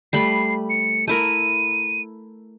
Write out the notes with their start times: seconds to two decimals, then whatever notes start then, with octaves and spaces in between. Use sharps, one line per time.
0.13 G3 A3 B5 C7
0.70 C#7
1.08 A3 E4 A#4 D#7